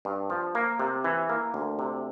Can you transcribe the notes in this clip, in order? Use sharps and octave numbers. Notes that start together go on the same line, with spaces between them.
G2
F3
A#3
C3
E3
A#3
D2
C3